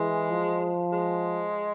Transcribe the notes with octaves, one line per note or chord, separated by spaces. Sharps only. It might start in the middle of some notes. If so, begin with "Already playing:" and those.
Already playing: E3 G#3
F3
G#3